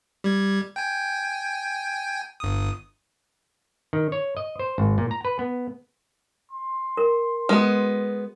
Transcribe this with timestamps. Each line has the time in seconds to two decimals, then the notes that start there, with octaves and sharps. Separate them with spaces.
0.24 G3 G#6
0.76 G5 G#5
2.40 G1 D#6
3.93 D#3
4.12 C#5
4.37 D#5
4.59 C5
4.78 G#1
4.98 A#2
5.11 A#5
5.25 B4
5.39 B3
6.52 C6
6.97 A#4
7.49 G#3 B3 F#4 B4